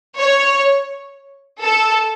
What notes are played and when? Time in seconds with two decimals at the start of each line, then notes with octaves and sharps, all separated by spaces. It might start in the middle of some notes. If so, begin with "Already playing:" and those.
0.17 C#5
1.61 A4